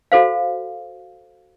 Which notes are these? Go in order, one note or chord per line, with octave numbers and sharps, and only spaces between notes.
F#4 A4 C5 F5